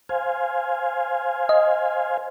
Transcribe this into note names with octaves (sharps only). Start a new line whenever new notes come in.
C5 F5 G#5
D#5